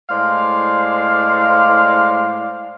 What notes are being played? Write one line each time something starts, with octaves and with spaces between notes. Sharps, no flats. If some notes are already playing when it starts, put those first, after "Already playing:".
A2 G#3 C5 D5 F5